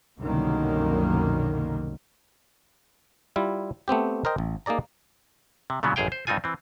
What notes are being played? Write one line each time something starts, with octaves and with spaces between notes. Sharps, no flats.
C2 F#2 B2 D3 D#3 A#3
G3 E4 F4
A3 B3 C4 G4
A#4 C5 D#5 G5
A1
A#3 D#4 G#4 D5 A#5
C3
A#2 C#3 E3 F#3 B3
A1 F#2 G#4 F5 G5
C5
G2 C4 D#4 F4 G#5
E3 C4